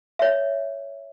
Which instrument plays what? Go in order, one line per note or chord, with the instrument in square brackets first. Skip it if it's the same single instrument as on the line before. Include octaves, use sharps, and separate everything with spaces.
[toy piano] C#5 E5